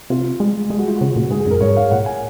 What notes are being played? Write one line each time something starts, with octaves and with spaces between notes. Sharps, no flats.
C3 F4
G#3
G#3 G#4
F#4
F4
C#3 F#4
A#2
G#2 G#4
G#4
F#2 A#4
G#2 C#5
F5
A#2 F#5
G#5